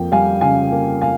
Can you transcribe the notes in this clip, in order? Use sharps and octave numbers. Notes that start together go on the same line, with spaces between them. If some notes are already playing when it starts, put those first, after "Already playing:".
Already playing: F2 A#3 G5
G3 F5 G#5
C#3 F5 G#5
A#3
F5 G#5